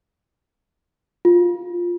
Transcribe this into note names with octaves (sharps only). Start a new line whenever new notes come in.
F4